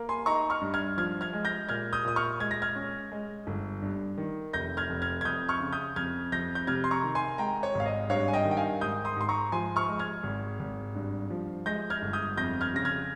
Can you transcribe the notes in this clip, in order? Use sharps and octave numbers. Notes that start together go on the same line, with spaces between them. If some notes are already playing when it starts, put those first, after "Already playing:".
Already playing: A#3
G#5 C6
D#4 A#5 C#6
C#6 F6
G2
F6 G#6
F3 F6 G#6
F6 G#6
G#3
G6 A#6
A#2 F6 G#6
D#6 G6
A#2 D#6
C#6 F6
G#3 G#6
A#6
F6 G#6
C#4
G#3
G1
G2
D#3
F1 G6 A#6
F6 G#6
F1
F6 G#6
G#6
F2 D#6 G6
C#6 F6
C#3
D#6 G6
F2 F6 G#6
F2 G6 A#6
G6
C3 F6 G#6
C6
A#5 C#6
D#3
G#5 C6
G#3 G5 A#5
C#5
G#1 F5
D#5
G2 C#5 F5
G#5
D#5 G5
D#3
G5
F5 G#5
G#2 D#6 G6
C6 D#6
G#2 C6
A#5 C#6
F3 G#5 C6
C#6 F6
G#3
F6 G#6
G#1
G#1
G2
F3
G#3 G6 A#6
F6 G#6
G1
D#6 G6
F2 G6 A#6
F6 G#6
C#3 A#6
F6 G#6